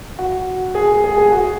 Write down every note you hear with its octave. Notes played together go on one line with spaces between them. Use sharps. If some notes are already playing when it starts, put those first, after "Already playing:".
F#4
G#4
G#4
G#4
F#4